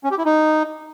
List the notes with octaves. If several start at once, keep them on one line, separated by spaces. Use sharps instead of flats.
C#4
G4
E4
D#4